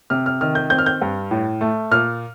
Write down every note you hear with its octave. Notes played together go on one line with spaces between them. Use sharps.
C3 F6
F6
D#3 F6
G6
C4 G6
F6
G6
G2
A2
A3
A#2 F6